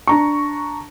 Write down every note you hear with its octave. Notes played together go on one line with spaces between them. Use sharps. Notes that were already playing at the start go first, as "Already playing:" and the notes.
D4 A#5 C#6